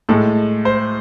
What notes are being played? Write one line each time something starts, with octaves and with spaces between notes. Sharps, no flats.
A2 G#3 A4
C5